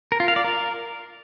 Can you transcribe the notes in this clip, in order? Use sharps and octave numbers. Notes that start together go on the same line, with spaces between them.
A#4
F4
F5
D5
A#4